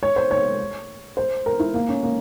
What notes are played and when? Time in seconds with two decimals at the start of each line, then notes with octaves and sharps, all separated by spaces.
0.03 C#5
0.16 C5
0.31 C#5
1.17 C5
1.46 A#4
1.60 E4
1.74 A#3
1.89 C#4
2.03 A#3